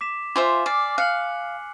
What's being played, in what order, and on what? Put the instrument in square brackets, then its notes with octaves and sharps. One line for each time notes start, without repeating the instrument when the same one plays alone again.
[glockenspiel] D6 B6 E7
[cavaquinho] F4 C5 E5 [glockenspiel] G#5 D6
[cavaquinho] D5 [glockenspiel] G#5 F6 C7
[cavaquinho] F5 [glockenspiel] F#6 C#7 F#7